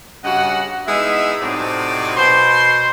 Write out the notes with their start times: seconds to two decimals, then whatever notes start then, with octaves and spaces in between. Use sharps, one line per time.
0.24 G2 C#3 F#4 D#5 F#5
0.87 G#3 B3 D#4 E4 E5
1.41 A2 C3 F#3 C4 D#4 D5
2.16 B2 C5 C6